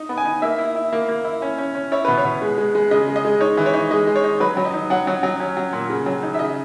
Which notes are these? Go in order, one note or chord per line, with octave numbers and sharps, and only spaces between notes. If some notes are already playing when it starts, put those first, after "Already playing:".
Already playing: D#4
B3
G#5
D#4
A#3 E5
E4
E4
A#3
A#3
E4
C#4
C#4
C#4
E4 C#5
B2 B4
C#5
B2
G#3
G#3
G#3
C#3 D#5
G#3
D#5
G#3
D#4 C#5
E3
C#5
D#4
G#3 D#5
G#3
C#5
D#4
F#3 B4
F#3
D#5
D#4
F#3 F#5
F#3
F#3
C#4
F#3
A#2
C#3
F#3
D#4
E5
C#3 D#5